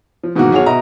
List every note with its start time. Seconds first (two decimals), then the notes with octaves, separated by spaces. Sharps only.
0.23 F3
0.36 G#2 B2 D#3 E3 A#3 F#4
0.52 B1 F#4 G#4 C#5 F7
0.66 B2 D#5 E5 A#5